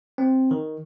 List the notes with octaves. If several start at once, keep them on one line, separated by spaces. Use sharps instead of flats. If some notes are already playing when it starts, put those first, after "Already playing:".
C4
D#3